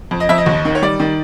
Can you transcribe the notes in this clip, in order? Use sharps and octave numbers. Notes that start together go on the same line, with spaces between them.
F2
D#5
F2 E5
D#5
D#2
D#3
C#5
G3 D5
D#3